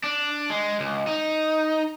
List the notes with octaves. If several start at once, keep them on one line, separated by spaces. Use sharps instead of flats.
D4
G#3
C#2
D#4